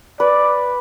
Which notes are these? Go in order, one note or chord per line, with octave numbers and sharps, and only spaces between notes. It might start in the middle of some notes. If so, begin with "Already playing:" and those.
B4 D5